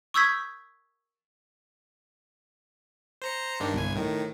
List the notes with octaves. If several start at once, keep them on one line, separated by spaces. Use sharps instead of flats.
C#6 D#6 E6 G6 G#6 B6
C5 A#5 C#7
G2 D#3 D4
G1 C2 G#5
A2 D#3